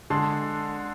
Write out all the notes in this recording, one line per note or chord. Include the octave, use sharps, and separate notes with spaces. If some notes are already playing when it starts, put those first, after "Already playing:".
D3 G#3 D4 A5 C6